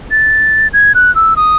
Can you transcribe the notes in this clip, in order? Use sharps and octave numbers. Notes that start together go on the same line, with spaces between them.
A6
G#6
F#6
E6
D#6